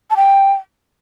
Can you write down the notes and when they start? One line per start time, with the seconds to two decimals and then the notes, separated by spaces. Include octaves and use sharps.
0.10 A5
0.16 G5